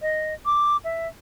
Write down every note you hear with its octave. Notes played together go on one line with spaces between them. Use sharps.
D#5
D6
E5